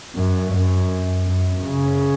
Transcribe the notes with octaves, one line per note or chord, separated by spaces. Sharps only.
F#2
F#2
F#2
C#3